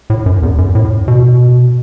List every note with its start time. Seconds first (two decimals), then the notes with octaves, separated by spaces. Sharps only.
0.10 A2
0.26 F#2
0.42 E2
0.58 F#2
0.75 A2
1.08 B2